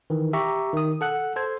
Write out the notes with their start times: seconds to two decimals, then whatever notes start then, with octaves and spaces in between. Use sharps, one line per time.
0.10 D#3 E3
0.33 G4 E5 A#5 C#6
0.73 D#3 D#6
1.01 A4 F#5 F#6
1.36 A4 C5 G#6